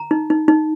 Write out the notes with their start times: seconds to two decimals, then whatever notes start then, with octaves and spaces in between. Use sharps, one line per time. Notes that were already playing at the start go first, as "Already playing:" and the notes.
Already playing: A#5
0.11 D#4
0.30 D#4
0.48 D#4